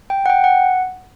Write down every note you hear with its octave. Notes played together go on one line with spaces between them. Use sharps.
G5
F#5
G5
F#5